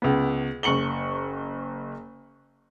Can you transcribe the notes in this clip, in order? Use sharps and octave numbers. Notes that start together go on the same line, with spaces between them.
C#2 B3
F#1 C#6 C#7 F#7 G7